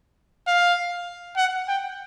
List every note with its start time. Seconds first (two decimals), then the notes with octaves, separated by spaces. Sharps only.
0.47 F5
1.37 F#5
1.68 G5